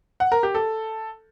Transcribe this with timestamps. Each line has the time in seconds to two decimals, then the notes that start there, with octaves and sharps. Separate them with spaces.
0.20 F#5
0.32 A#4
0.43 G4
0.55 A4